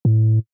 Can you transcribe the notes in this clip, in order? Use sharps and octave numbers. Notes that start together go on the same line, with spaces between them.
A2